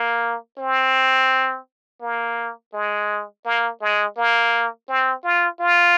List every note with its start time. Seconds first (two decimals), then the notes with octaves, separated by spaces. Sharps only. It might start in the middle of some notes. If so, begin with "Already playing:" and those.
Already playing: A#3
0.58 C4
2.01 A#3
2.73 G#3
3.45 A#3
3.81 G#3
4.17 A#3
4.89 C4
5.24 F4
5.60 F4